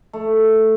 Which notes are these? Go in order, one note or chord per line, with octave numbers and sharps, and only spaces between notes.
A3